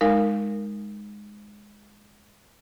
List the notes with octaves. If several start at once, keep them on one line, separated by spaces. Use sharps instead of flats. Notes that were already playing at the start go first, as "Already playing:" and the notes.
G#3 D#4 A#4 F5